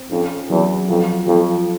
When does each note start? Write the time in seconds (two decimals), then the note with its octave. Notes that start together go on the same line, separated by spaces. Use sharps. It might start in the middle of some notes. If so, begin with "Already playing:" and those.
Already playing: C4
0.11 F2 C#4
0.50 E2 F#3
0.89 F2 F3
1.27 F2 F3